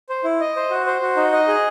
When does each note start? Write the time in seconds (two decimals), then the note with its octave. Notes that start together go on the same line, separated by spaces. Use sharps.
0.09 C5
0.24 E4
0.40 D#5
0.56 C5
0.70 F#4
0.86 C5
1.01 F#4
1.17 D#4
1.33 D#5
1.47 G#4